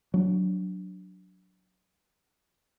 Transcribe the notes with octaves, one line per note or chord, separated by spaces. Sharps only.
F#3 D4